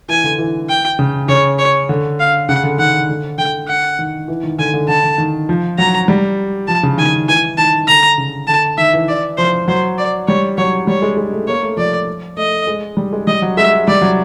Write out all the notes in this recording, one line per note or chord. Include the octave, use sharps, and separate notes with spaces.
E3 G#5
D3
E3
G5
C#3
C#3 C#5
C#5
D3
F5
C#3 F#5
D3
D#3 F#5
D3
D3 G5
F#5
D#3
E3
D#3
D3 G#5
D3
D3 A5
D3
D#3
F3
F#3 A#5
G3
F3 A5
C#3
D#3 G#5
E3 G#5
D#3 A5
D3 A#5
C#3
D3 A5
D#3 E5
E3
D5
F3 C5
F#3 C5
D5
G3 C#5
F#3 C#5
G3 C#5
G#3
G#3
A3
A#3 C#5
A3
F3 D5
A3 D#5
G#3
G3
G#3
G3 D#5
F#3
G#3 E5
G3 D5
F#3